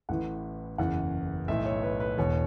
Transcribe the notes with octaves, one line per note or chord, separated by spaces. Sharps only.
A1 A2 E3 F#5
F#1 E2 C#3 E3 F#5
B1 A2 E3 E5
C#5
B4
B4
E1 E2 B2 C#5